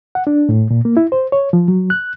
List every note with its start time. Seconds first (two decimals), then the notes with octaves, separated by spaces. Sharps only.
0.15 F#5
0.27 D4
0.49 A2
0.71 A#2
0.85 A#3
0.97 E4
1.12 C5
1.32 C#5
1.53 F3
1.68 F#3
1.90 F#6